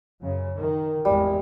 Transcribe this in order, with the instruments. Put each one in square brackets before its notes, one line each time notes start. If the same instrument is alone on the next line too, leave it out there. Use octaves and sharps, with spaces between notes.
[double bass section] F#2 C#3
D#3
[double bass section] G#1 E2 G#3 [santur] G3